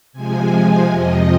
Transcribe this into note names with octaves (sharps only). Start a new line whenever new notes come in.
C3 F3 G#3 G#5
G#5
F2 C3 F3 D#5